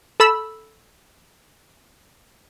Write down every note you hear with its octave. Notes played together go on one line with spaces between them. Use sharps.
A4 B5 E6